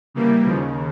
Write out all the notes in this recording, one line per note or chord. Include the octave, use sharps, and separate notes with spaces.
C#3 E3 G3 A#3
D#2 C#3 F3